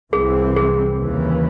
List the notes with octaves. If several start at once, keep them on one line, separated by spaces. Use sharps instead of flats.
C2 C3 E3 C4 G#4
G#4
D#2 C#3 E3